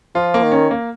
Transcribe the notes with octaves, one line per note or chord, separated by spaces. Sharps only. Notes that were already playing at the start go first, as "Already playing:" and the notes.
F3 F4
A#3
D#3
C#4
A#3